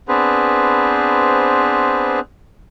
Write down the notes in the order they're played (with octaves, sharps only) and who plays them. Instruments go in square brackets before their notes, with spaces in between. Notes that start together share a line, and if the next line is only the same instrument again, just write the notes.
[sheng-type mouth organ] B3 C4 D4 G#4 B4 C5